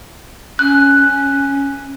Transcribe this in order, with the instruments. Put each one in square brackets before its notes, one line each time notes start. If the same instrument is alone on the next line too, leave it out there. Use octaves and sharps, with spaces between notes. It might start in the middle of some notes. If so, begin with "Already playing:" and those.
[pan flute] C#4 [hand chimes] F#6